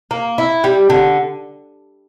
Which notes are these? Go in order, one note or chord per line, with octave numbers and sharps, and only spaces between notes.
A#3
E4
G3
D3